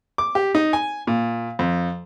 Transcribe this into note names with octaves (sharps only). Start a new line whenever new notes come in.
D6
G4
D#4
G#5
A#2
F2